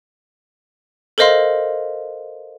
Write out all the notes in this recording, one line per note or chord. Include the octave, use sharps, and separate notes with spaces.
A4 A#4 C5 D#5 F5 C6